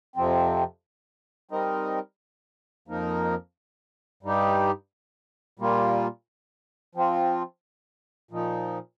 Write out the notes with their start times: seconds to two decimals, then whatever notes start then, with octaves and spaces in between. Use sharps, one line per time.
0.16 F2 C3 F3 C4
1.51 G3 C4 D#4 A#4 D#5
2.88 F2 F3 A#3 D#4 A#4
4.23 G2 G3 D#4 G4
5.59 A#2 G3 A#3 F4
6.95 F3 C4 F4
8.31 A#2 F3 D#4